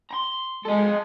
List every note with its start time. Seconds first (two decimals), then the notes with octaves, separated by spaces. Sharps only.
0.11 A#5 C6
0.65 G#3 A4 D#5